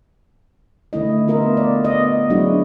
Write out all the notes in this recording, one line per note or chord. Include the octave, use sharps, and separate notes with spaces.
D3 A3 E4 D#5
B3 F4 A#4 D#5 E5
D5
B3 D#5
F#3 G#3 D4 E4 F#4